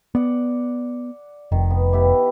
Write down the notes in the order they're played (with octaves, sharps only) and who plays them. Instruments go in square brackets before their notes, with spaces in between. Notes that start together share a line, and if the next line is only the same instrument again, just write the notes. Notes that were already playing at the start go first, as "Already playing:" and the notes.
[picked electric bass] B3 [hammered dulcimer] D5 F#5
[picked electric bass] F1 [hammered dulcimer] D#3
[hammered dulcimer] B3
B3 E4 G4